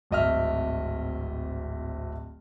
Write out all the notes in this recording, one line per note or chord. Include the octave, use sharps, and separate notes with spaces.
D1 G#1 D#5 E5 F6